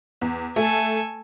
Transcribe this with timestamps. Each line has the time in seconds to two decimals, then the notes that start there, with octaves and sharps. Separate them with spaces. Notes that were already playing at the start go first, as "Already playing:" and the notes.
0.21 E2
0.56 A3 A4 G#5